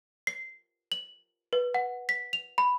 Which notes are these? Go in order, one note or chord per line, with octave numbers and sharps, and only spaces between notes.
C7
F#7
B4
F#5
B6
F7
B5